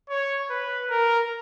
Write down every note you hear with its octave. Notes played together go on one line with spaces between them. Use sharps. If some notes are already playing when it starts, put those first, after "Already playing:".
C#5
B4
A#4